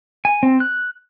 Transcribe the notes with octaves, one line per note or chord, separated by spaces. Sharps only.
G#5
C4
F#6